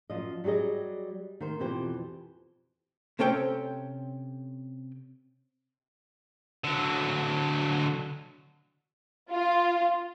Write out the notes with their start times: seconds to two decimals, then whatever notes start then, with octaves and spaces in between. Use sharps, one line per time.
0.10 F#2 F3 D#5
0.44 F#3 G3 G4 G#4 D#5
1.41 D#3 C5
1.60 F2 B2 E3 G4 C5 G5
3.19 C3 C4 C#4 A4 C#5 G5
6.64 D3 F#3
9.31 F4